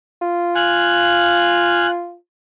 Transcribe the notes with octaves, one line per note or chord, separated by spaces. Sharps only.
F4
F5 G#5 F#6